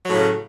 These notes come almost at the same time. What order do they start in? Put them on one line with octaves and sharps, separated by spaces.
F#3 A2 C#3